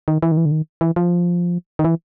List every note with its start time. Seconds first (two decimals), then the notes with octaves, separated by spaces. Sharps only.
0.08 D#3
0.22 E3
0.32 D#3
0.37 E3
0.45 D3
0.52 D#3
0.81 E3
0.96 F3
1.79 D#3
1.84 E3